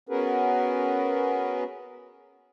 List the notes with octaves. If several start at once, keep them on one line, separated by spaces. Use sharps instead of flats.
B3 C#4 F#4 G#4 A#4 B4